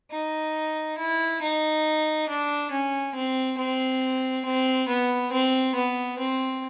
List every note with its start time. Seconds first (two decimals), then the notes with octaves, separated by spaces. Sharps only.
0.11 D#4
0.98 E4
1.42 D#4
2.29 D4
2.71 C#4
3.15 C4
3.58 C4
4.45 C4
4.89 B3
5.32 C4
5.75 B3
6.19 C4